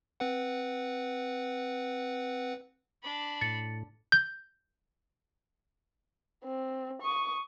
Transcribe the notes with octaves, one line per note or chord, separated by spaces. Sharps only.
C4 B4 F#5
D4 B5
A2 A6 C#7
G6
C4
C#6 D#6